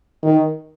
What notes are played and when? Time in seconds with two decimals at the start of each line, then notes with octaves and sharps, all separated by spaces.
0.23 D#3